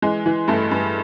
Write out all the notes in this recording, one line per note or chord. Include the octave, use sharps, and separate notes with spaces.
E3 G#3
E3
G2 A3
G2